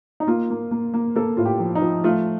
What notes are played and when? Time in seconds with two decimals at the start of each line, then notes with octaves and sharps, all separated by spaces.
0.20 D#4
0.27 A#3 F4
0.50 A#3
0.71 A#3
0.94 A#3
1.16 A#3 A4
1.37 A2 F4
1.45 G4
1.60 F3
1.75 D#4
1.82 F3
2.04 A3 F4